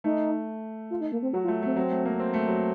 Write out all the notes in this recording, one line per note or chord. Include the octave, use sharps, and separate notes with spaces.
A3 D#4
F4
D#4
A#3
C4
F#3 F#4
F4
A3
A3 C4
F#3 C4
A3
A#3
C4
A3
F#3